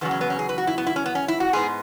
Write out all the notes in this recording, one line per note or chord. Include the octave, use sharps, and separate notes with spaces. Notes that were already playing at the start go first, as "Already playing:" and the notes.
E2 C#3 F#3 B3
C#4
B3
C#4
G#4
B4
F#4
E4
B3
E4
C#4
B3
C#4
E4
F#4
G#2 G#3 B3 G#4